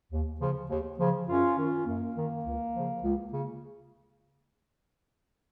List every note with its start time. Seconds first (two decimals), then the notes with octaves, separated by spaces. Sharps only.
0.12 D#2
0.41 C#3 F3
0.70 D#2
1.00 C#3 F3
1.28 F#2 C#4 F4
1.58 D#3 C#4 F4
1.87 F#2 A#3
2.17 D#3
2.46 C#2
2.75 C#3 F3
3.04 C#2
3.33 C#3